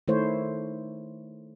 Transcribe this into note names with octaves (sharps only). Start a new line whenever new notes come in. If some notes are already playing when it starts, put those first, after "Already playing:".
D#3 A3 E4 C5 C#5